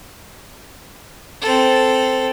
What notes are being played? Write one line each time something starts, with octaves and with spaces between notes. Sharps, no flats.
C4 A4